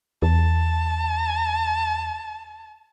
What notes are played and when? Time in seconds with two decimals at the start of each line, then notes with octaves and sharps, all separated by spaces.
0.22 E2 A5